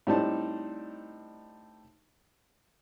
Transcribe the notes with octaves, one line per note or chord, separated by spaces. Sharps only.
A2 G3 C4 D4 D#4 A5